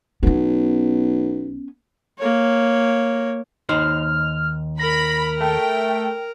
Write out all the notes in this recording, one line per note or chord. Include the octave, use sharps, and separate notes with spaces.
B1 B3 C#4
A#3 C#5
D#2 D#4 C5 F6
A#4 B5 A#6
A3 G5